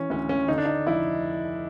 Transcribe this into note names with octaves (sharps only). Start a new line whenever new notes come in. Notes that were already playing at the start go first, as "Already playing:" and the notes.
Already playing: E3 C#4
D2 C#4
C#4
D3 D#4
D4
D#4
F1 E4